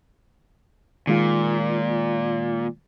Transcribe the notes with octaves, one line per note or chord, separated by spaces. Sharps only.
A#2 D#3 G#3 F4